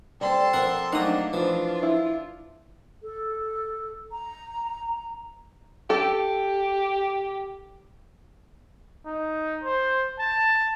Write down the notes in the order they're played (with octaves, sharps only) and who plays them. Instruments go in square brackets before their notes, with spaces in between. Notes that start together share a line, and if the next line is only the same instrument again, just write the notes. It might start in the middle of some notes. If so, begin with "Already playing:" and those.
[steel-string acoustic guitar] G3 C4 [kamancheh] A4 C6
[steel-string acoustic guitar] F3 C4 [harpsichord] A#4 F#5
[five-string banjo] F#3 A3 D#4 [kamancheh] A#3 D4 [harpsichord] F#5 D#6
[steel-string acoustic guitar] E3 [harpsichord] F3 [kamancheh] D4 F4
[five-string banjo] E4
[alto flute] A4
A#5
[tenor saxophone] G4 [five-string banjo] A4
[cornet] D#4
C5
A5